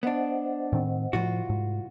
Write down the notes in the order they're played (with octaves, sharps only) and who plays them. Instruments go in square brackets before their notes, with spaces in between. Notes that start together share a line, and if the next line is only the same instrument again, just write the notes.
[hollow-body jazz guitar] B3 D4 [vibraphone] C5 D#5 F#5
[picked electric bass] A2 D#3 C4
[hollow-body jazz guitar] C2 F4 F#4 [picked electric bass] A2 F3
[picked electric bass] G#2